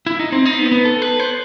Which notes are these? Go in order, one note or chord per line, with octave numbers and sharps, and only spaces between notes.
E4
D#4
C4
D#4
B3
B3
A4
B4
C5